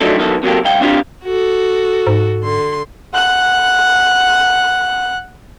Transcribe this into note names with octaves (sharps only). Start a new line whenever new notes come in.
F3 F#3 A3 D4 D#4 A4
F#2 B2 D#3 E3 A4
C3 F#3 A#3 G4 A4
C2 F5 G5
C4 D4 F4 G4
F#4 A4
G#2
D3 C6
F#5 F#6